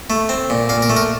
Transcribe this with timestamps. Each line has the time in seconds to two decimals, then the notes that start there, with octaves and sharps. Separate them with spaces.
0.10 A3
0.29 C4
0.50 A#2
0.69 A#2 F5
0.82 A#4
0.90 A3
0.97 A#4